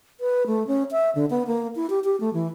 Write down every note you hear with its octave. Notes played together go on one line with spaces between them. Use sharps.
B4
A3
C#4
E5
D3
B3
A#3
E4
G4
G4
A3
E3